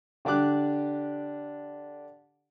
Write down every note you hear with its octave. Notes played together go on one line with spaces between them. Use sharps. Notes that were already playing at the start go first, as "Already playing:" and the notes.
D3 D4 G4 D6 F#6